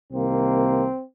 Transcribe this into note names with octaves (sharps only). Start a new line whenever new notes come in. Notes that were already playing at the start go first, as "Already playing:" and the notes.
C2 C3 D#3 A#3 C4